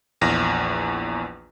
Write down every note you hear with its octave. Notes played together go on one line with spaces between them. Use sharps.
A#1 E2 A#6